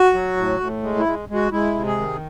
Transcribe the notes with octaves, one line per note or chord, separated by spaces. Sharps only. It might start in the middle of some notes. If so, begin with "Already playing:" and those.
Already playing: F#4
F#3
A2
A2
G#3
E4
G#3
G#3 F#4
G#3 E4
C3
G#4
D#3